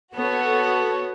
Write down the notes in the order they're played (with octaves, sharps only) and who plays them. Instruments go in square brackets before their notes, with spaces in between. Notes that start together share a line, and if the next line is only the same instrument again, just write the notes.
[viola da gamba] B3 [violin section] F#4 A4 C#5